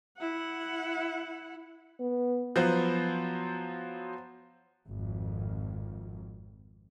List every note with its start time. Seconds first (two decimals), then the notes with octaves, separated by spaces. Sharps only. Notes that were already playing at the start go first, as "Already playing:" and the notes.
0.18 E4 F#5
2.00 B3
2.56 F3 F#3 B3 C5
4.87 G#1 F2